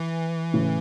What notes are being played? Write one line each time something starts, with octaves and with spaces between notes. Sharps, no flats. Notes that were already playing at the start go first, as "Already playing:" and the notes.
Already playing: E3
A2 C#3